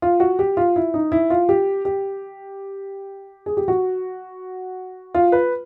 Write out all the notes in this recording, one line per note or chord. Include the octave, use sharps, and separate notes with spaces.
F4
F#4
G4
F4
E4
D#4
E4
F4
G4
G4
G#4
G4
F#4
F4
B4